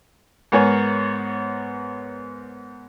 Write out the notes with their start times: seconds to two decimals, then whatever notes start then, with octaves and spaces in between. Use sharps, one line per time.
0.52 G#2 B3 A#4 C#5 G#5